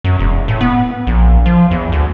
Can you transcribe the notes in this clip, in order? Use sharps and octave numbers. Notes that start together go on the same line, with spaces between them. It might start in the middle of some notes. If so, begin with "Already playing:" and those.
F#2
E1
A2
B3
A#1
F3
E2
D2